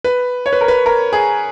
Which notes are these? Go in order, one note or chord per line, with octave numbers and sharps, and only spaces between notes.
B4
C#5
B4
A#4
B4
A#4
G#4